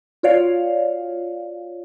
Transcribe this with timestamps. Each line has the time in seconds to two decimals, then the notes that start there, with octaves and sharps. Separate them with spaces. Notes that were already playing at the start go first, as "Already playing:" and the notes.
0.23 F4 F#4 C#5 D5 F5